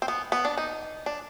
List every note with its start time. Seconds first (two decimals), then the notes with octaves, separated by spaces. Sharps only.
0.02 C4
0.08 B3
0.32 B3
0.45 D4
0.57 D#4
1.06 D4